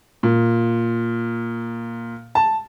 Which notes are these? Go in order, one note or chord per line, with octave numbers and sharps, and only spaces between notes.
A#2
A5